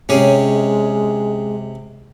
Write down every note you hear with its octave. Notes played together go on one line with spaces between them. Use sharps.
C3 G#3 C#4 G4 G#4